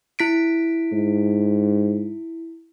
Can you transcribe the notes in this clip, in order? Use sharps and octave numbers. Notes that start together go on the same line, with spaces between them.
E4 B6 D7
G#2